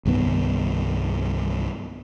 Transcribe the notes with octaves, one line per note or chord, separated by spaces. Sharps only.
C2 G2 D#3 B3